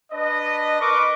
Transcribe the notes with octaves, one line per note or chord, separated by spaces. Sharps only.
D4 B4 D#5
A#4 B4 D#5 C#6 D6